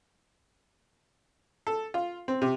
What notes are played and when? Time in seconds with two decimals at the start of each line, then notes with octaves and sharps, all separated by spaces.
1.67 A4
1.94 F4
2.28 C4
2.42 C3